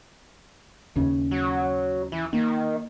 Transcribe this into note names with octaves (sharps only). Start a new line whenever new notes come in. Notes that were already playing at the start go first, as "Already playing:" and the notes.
D#2 C#3
F#3
E3
D#3 A#3